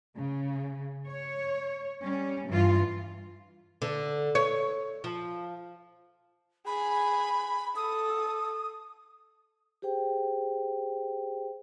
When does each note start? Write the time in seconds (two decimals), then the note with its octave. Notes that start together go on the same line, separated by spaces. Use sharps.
0.16 C#3
1.07 C#5
2.01 G3 C#4
2.49 G2 E3 F4
3.82 D3
4.35 C#5
5.04 F3
6.67 G#4 G#5 B5
7.76 A4 D#6
9.82 G4 G#4 C5 G5